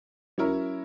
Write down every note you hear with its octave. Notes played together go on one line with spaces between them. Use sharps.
F#3 C#4 E4 A#4 C#5